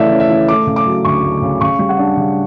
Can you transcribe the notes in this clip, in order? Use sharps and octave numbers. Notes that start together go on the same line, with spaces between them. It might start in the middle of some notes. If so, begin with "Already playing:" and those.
Already playing: C#3 E3 A3 C#4 D5 E5
C#4
E5
E3
A3 D6
C#3
D6
F#3
D2 C#6
A3
C#3
C#3 C#6
G3
F#5
D4
C#3